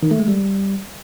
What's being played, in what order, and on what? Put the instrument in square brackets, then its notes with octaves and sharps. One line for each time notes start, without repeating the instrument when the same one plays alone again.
[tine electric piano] D#3
A3
G#3
G3